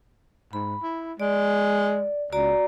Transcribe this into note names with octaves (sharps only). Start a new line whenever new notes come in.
G#2 B5
E4
G#3 D5
C#2 F#4 D5 A#5